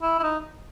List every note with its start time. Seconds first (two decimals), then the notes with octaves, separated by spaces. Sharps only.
0.02 E4
0.19 E4
0.23 D#4